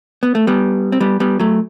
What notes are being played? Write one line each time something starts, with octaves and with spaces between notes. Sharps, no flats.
B3
A3
G3 B3
C4
G3 B3
G3 B3
F#3 A3